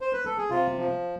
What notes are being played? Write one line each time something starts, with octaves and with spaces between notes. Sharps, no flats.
C5
B4
A4
G#4
C3 F4
F3